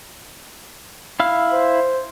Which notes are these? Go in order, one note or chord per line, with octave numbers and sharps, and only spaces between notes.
E4 F5 F6
C5